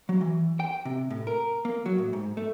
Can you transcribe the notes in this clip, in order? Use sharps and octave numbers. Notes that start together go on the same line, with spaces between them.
F#3
E3
G5
C3
A2
A#4
A#3
F#3
A2
G#2
A3